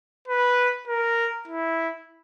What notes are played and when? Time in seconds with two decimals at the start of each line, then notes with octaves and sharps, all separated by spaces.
0.28 B4
0.88 A#4
1.48 E4